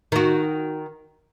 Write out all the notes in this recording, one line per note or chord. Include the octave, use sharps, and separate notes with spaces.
D#3 F#4